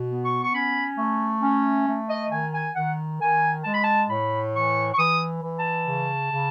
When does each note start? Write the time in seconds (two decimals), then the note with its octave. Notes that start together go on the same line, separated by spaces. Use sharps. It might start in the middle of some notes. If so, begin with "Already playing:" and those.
Already playing: B2
0.08 B3
0.23 C#6
0.43 C#6
0.53 C#4 B5
0.97 A3
1.42 C#4
1.86 A3
2.08 D#5
2.30 D#3 G#5
2.53 G#5
2.75 D#3 F#5
3.20 D#3 G#5
3.64 G#3 A5
3.73 B5
3.83 A5
4.08 A2 B5
4.53 E3 C#6
4.94 C#6
4.98 E3 D#6
5.42 E3
5.57 A5
5.86 C#3
6.32 C#3